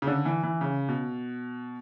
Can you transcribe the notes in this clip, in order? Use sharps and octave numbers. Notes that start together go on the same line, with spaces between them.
C#3
D3
E3
E3
C#3
B2